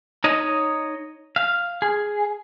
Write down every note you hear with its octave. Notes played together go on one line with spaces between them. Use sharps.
D#4 C#5 D#5
F5
G#4